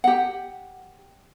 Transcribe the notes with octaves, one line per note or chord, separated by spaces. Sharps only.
G4 F#5